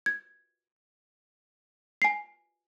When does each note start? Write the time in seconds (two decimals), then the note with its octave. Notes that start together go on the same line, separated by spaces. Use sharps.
0.06 G#6
2.02 G#5 C7